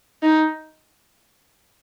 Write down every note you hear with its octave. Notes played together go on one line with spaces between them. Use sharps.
D#4